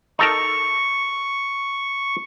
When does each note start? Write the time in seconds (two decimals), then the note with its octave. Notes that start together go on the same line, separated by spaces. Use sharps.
0.19 D#4 A4 A#4 C#6